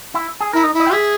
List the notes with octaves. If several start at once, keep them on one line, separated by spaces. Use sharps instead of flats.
E4
G#4
E4 A#4
D#4
E4
D#5
G5
G#4 E5